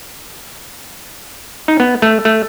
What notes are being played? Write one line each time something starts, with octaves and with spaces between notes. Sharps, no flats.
D#4
B3
A3
A3